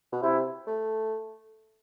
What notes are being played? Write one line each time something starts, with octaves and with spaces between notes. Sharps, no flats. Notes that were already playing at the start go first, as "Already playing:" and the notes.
B2
C3 E4
A3